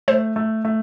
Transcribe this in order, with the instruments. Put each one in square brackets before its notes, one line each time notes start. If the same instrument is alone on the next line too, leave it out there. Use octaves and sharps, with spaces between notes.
[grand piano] A3 [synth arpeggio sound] C5
[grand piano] A3
A3